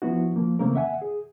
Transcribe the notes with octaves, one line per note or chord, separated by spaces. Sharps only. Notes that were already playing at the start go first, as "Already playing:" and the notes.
F3 B3 E4 F#4
F3 A#3
C#3 E3 A3 A#3 C4 A#4
E5 F#5 G#5
G#4